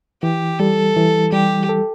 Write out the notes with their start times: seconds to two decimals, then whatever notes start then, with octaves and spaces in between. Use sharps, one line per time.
0.23 E3 G4
0.59 G3 A4
0.96 E3
1.32 G3 G4
1.69 A4